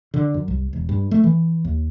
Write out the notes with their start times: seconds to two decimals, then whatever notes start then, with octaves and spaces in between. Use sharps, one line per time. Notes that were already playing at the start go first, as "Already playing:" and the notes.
0.14 D3
0.34 F#2
0.48 C2
0.73 E1
0.89 G2
1.11 A3
1.24 E3
1.65 D#2